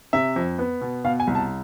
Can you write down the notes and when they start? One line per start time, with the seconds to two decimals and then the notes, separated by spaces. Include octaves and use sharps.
0.13 C3 E5
0.36 F2
0.59 B3
0.81 B2
1.04 B2 F5
1.20 G#5
1.27 C2
1.35 A5